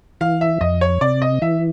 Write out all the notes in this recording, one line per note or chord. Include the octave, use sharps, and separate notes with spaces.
E3 F5
E5
F2 D#5
C#5
C3 D5
D#5
E3 E5